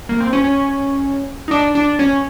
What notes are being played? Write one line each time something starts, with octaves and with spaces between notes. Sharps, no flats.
A#3
C4
C#4
C#4
D#4
D4
D4
C#4